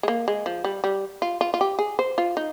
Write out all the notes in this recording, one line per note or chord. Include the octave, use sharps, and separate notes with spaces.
G#3
A#3
G#3
F3
G3
G3
F4
F4
F4
G4
G#4
C5
F4
D#4